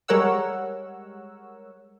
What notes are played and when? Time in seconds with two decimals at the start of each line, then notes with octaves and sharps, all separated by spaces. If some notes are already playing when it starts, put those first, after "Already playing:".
0.08 G3 G#3 A#4 C#5 F#5 E6